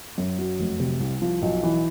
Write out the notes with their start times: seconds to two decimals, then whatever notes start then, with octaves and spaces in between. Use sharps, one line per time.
0.18 F#2
0.39 F#3
0.60 F1
0.80 C3
1.00 C2
1.22 F3
1.42 B1
1.63 E3